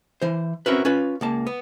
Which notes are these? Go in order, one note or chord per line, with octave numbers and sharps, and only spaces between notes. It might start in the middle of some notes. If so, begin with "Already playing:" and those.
E3 C5
C4 C#4 E4 F#4 A#4 B4
C#4 F4 B4
C#2 A#3 A5
B3